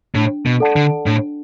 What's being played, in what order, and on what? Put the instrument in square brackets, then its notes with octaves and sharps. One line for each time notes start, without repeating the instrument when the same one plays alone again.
[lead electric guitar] A2 [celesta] D4
[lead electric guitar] B2
[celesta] A4 D5 F#5 A5
[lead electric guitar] D3
[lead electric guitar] A2 [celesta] D4